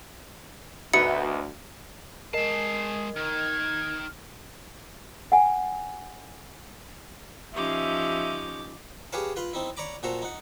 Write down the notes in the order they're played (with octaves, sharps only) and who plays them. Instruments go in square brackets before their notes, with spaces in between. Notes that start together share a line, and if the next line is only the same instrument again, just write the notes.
[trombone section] D2 [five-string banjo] B3 D#4 B4 [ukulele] F#4 E5 [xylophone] C#7
[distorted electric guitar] G#3 A5 [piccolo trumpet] G#4 [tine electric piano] A#4 D#5 [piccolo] C7
[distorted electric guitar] D#3 [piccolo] F6 [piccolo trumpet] G#6
[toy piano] F#5 G#5
[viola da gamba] F3 C#4 D#4 [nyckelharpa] G4 D6 [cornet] E5
[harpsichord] G4 G#4 B4 C#5 F5 A5
F4 B4 F5 B5 C6
C4 D#4 E4
C#5 D5 A#5 B5 D6
A#2 F#4 A4 C5 A#5
D#4 F#5